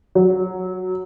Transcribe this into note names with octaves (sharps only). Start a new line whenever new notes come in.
F#3